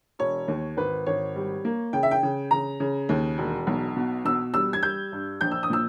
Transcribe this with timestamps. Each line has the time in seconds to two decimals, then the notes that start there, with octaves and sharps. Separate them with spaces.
0.19 E1 C#5
0.48 D#2
0.77 G#1 B4
1.06 G#1 C#5
1.36 G3
1.65 A#3
1.93 C#3 G5
2.03 E5
2.11 G5
2.23 C#3
2.51 C#3 A#5
2.80 C#3
3.09 D#2
3.38 E1
3.67 B1
3.97 B2
4.25 B2 E6
4.54 G3 E6
4.73 G#6
4.83 G3 G6
5.12 G2
5.41 A#1 G6
5.51 E6
5.63 D#6
5.70 A#2 E6